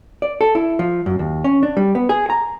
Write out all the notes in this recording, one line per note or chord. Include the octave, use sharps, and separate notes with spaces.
D5
A4
E4
F3
F#2
D#2
C#4
D4
G3
B3
G#4
A#5